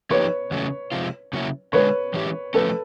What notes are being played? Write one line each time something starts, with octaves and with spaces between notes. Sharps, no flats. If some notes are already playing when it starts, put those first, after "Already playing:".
F3 A#3 D#4 G4 B4 C#5
E2 C#3 F#3 A3 C#4
C3 F3 G#3 C4 F4
C#3 F#3 A#3 C#4 E4
D3 F3 G#3 B4 C#5
E3 G#3 C#4 E4 G4
F3 A3 C#4 A4 B4